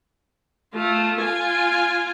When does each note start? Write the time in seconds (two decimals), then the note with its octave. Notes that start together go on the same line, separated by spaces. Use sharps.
0.75 A3 F4
1.21 F4 G#5